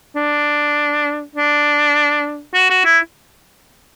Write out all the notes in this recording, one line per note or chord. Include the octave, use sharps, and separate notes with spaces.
D4
D4
F#4
F#4
E4